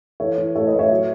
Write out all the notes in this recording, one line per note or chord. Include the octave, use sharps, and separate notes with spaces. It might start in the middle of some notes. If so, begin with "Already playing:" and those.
E3 A4 C#5
E3
A2 A4 C#5
B4 D#5
A2
C#5 E5
F#3